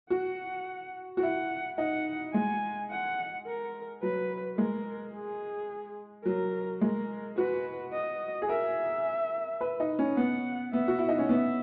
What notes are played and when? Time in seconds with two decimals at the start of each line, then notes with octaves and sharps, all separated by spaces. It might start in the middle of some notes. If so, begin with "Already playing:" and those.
0.10 F#4 F#5
1.17 F#4
1.22 E4 F#5
1.78 D#4 F#5
2.34 G#3 G#5
2.91 F#5
3.46 A#4
4.03 F#3 B4
4.58 G#3 A#4
5.14 G#4
6.26 F#3 A#4
6.81 G#3 A#4
7.38 F#4 B4
7.93 D#5
8.42 G#4
8.49 A#4 E5
9.61 B4
9.80 D#4
9.99 C#4
10.17 B3 F#5
10.73 B3 E5
10.88 F#4
10.98 E4
11.09 D#4
11.19 C#4
11.29 B3 E5